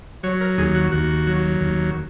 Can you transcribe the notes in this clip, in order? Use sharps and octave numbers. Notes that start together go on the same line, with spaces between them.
F#3 C#5
A#4
D#2 G#4
F#4
D#2 F#4
F#3
D#2